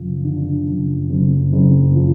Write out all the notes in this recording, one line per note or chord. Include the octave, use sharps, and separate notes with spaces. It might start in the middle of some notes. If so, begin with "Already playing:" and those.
Already playing: F#1 F3
D3
F#1
F#1
F#1
F3